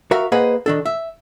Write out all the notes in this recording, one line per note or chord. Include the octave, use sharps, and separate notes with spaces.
F#4 A#4 E5 F5
A#3 G#4 B4 C5 D#5 F#5
D#3 D4 A4
E5